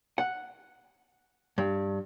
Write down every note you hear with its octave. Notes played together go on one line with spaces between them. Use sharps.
F#5
G2